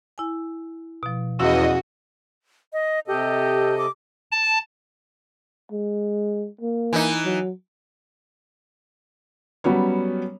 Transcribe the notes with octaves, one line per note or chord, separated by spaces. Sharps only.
E4 G#5
B2 F3
E2 C#4 E4 F#4 D#5 F5
D#5
C3 G4 A4 D#5
D6
A5
G#3
A#3
E3 D#4
F#3
F#3 G3 B3 C#4 C#5